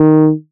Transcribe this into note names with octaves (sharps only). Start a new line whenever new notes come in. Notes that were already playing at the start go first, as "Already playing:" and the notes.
Already playing: D#3